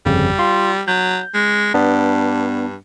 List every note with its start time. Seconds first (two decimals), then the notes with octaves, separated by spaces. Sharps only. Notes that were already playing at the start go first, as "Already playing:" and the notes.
0.06 G1 F2 C#3 G3
0.39 F4 C6
0.88 F#3 G6
1.34 G#3
1.74 G2 B3 D4